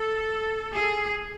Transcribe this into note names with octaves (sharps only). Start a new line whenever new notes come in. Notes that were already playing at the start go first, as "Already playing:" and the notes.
Already playing: A4
G#4